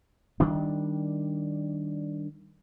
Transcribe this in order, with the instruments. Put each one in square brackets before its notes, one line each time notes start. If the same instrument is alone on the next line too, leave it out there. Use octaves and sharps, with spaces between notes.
[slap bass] D#3 G3 D4